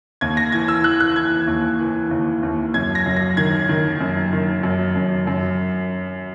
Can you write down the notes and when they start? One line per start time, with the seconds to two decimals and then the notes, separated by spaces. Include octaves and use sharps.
0.21 D#2 G#6
0.37 A#6
0.52 E3 G#6
0.68 E6
0.84 E3 F#6
1.00 F#6
1.16 E3 G#6
1.47 D#2
1.79 E3
2.11 D#2
2.43 D#2
2.74 F#2 G#6
2.95 A#6
3.06 F#2
3.16 A#6
3.37 D#3 G#6
3.69 D#3
4.01 F#2
4.33 D#3
4.63 F#2
4.95 F#2
5.27 F#2